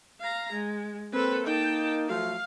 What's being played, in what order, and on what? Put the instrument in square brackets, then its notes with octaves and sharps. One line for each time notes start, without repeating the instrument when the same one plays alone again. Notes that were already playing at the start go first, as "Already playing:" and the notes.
[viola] F5 A#5
G#3
[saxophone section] A#3 C4 [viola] A4 B4
[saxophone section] A#3 D#4 [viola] G5 A5
[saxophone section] F3 F#3 A3 [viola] F5